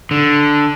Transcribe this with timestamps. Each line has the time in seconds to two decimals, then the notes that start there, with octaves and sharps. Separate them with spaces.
0.11 D3